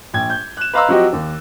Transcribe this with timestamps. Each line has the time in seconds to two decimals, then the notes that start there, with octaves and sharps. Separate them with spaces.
0.14 A#1 G5 G#6
0.30 G6
0.57 F#6 E7
0.73 B4 D#5 F5 A#5 C6 E6
0.88 F3 F#3 C4 F#4 G4 D#5
1.13 D#2